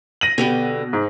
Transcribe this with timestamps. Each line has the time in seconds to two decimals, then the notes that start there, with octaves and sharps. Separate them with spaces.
0.21 A#6 D#7 F#7
0.38 B2 D3 B3 G4
0.93 G#2